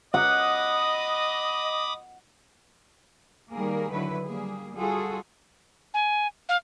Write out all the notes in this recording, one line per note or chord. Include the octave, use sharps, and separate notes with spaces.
D#5 F#5 B5 D6 D#6
D#3 G3 A#3 G#4 A#4
D3 D#3 F#3 E4 B4
G3 A#3 G#4
G3 F4 F#4 G#4 A4
G#5
F5